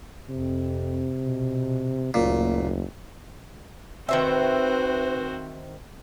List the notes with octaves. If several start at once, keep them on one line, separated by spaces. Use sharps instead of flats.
F2 C3
B2
F#1 D2 A#2
D#3 C4 F#4 B4 C5 E5